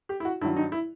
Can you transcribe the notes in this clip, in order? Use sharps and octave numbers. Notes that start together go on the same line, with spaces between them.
G4
E4
F#4
G2 D#3 F#3 E4
D#4
E4